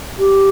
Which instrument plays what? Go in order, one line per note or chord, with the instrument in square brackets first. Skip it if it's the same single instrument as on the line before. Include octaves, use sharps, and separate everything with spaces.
[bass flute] G4